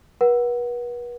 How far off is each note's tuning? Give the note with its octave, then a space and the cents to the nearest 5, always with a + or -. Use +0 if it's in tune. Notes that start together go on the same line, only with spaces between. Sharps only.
B4 -40 F#5 +0